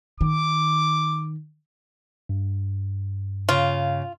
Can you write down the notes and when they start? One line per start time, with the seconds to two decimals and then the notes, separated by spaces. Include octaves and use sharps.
0.21 D#3 D6
2.29 G2
3.49 C#3 F4